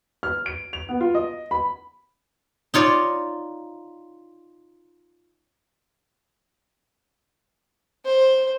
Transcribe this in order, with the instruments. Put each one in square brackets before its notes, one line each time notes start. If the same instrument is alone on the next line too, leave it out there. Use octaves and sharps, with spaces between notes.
[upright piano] F6
D7
F7
B3
F4
D#5
B5
[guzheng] D#4 F4 C#5 D5
[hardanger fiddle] C5